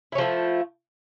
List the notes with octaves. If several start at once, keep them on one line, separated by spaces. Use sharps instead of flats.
F3 A3 C#4 E4